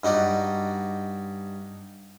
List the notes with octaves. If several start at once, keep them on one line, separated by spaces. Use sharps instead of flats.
G2 D#4 F#4 D5